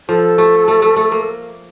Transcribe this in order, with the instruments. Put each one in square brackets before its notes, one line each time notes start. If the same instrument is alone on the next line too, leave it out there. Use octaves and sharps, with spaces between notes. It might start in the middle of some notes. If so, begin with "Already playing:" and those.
[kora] F3 [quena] A4
[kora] A3
A3
A3
A3
A#3